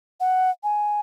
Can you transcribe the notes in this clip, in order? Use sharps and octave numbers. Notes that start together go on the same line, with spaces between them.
F#5
G#5